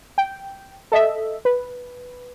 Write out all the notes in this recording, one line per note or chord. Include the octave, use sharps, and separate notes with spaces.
G5
A4 D#5 E5
B4